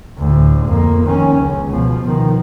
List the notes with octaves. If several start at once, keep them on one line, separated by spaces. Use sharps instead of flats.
D2 A2
F2 A#3
D#3 C#4
C#2
B2 F3
B2 D#3